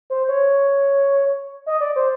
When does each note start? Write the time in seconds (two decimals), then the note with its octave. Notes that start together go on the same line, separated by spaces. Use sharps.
0.10 C5
0.28 C#5
1.66 D#5
1.81 D5
1.96 C5